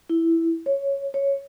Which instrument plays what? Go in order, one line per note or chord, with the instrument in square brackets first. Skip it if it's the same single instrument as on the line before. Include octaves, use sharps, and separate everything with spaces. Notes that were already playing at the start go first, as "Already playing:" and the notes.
[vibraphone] E4
C#5
C#5